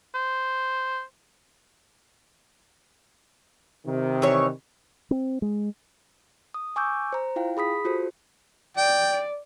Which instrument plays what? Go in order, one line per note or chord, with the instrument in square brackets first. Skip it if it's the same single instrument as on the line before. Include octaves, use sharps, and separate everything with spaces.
[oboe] C5
[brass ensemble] C3 D#3
[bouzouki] E3 C#5
[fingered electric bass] C4
G#3
[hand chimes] D#6
G#5 C#6 D6 E6 G6
C5 A#5
E4 F4 F5 G5
G#4 B5 D#6 B6
F4 F#4 A4 C5
[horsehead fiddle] D5 [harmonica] G5